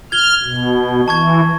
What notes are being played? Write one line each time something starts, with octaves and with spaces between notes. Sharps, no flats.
F6 G#6 G7
B2
E3 A5 C#6 G#6